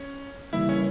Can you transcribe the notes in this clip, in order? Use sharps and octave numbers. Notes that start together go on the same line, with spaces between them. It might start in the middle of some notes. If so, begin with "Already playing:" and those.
Already playing: C#4
C#3 E3 G3 A#3 E4
C#4